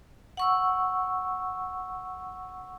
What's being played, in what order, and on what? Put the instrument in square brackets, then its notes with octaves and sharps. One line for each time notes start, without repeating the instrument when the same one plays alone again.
[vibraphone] F#5 C#6 E6